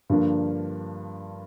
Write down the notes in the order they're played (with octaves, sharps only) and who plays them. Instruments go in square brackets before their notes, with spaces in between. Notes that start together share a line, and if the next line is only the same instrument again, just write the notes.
[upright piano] G2 D3 F3 A#3 D4